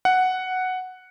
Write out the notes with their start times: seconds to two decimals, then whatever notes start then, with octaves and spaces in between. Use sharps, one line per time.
0.05 F#5